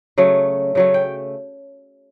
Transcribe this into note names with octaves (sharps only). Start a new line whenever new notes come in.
C#3 F#3 A3
C#3 F#3 A3
G5